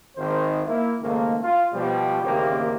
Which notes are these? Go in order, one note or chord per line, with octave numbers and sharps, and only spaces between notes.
G#1 D#3 C5
A#3 E4
C#2 G#2 D#3 A3 A#3
F4
B2 F3 G3
A1 D#2 C#3 A#3 C4 G4